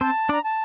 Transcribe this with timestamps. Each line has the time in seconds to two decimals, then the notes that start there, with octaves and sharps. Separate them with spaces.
0.01 C4 C5 A5
0.29 D4 D5 A#5
0.44 A5